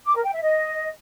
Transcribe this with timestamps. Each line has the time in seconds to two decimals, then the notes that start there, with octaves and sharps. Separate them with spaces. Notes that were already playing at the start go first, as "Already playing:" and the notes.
0.05 D6
0.14 A#4
0.23 G5
0.32 E5
0.42 D#5